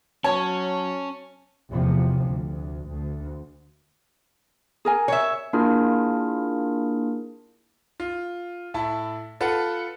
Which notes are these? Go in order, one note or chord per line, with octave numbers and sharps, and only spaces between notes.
F#3 C#4 C#5 A5
F1 E2 C3 F3
D2
D2
G#4 A#4 G#5
C#5 E5
A#3 D4 E4 F4 G#4 A#4
F4
A2 E4 A5
F4 A4 B4 F#5 A5